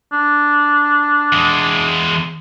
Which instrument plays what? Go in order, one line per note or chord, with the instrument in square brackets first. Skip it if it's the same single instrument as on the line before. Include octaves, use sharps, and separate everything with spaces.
[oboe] D4
[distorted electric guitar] E2 G#3